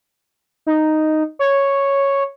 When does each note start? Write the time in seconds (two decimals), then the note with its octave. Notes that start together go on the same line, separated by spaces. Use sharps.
0.67 D#4
1.39 C#5